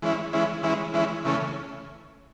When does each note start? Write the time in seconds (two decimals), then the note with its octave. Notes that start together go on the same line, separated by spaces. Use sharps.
0.02 E3 G#3 C#4 E4
0.33 E3 G#3 C#4 E4
0.63 E3 G#3 C#4 E4
0.94 E3 G#3 C#4 E4
1.25 C#3 E3 A3 C#4